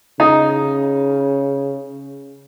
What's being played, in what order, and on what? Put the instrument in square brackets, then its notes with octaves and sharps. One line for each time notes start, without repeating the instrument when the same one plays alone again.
[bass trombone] C#3 [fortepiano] D#4